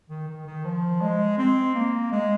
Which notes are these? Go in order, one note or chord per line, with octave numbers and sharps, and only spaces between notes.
D#3
D#3
D#3
F3
G#3
C4
A#3
G#3